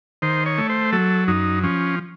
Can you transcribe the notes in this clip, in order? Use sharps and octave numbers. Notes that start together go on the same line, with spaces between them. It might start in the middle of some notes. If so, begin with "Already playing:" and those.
D#3 C5
C#5
A3
C5
F#3 A4
F#2 D#4
F3 C#4